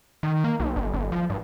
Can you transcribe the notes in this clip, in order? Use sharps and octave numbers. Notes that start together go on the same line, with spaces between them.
D#3
A#3
B1
G1
G1
F3
G2